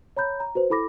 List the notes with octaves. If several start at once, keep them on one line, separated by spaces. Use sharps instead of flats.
C#5 A#5 B5 G6
A#5
F#4 B4 C5
E4 A4 B5 D6 A#6